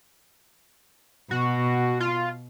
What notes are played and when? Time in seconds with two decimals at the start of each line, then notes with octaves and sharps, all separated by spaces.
1.31 B2 F#4
2.00 F4